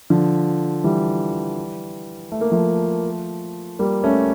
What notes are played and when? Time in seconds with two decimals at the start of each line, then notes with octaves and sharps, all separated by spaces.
0.10 D3 F3
0.84 E3 G3
2.32 A3
2.41 A#3
2.52 F3 A3
3.79 G3 A#3
4.04 A3 C#4